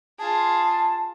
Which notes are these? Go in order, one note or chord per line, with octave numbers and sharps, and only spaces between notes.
F4 G#4 A5